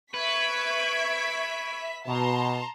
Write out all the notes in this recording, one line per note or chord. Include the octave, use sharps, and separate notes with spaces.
B4 E5 C#6 G#6 B6 D7
B2 A5 A#5 C6